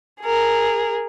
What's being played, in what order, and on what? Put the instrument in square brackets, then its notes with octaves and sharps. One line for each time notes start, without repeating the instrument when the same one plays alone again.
[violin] G#4 A#4